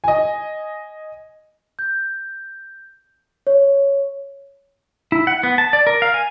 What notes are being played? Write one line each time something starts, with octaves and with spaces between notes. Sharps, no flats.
D#5 G#5
G6
C#5
E4
F#5
B3
A5
D5
A#4
F5
G#5